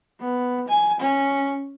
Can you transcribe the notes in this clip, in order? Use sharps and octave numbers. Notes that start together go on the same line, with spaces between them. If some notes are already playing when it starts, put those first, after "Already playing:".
B3
G#5
C#4